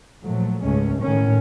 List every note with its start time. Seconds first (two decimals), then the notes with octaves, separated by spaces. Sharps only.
0.24 A#2 F3 F#3 A3
0.63 C#2 G#2 G#3 A3 C#4
1.01 A2 D#3 C#4